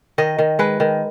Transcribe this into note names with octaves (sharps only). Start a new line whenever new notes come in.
D#3 D#5
D#3
G#3 B4
D#3